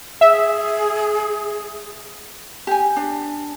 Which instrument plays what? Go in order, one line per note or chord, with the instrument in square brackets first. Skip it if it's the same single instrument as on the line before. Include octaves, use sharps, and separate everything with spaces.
[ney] G#4 [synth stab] E5
[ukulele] G4 G#5
D4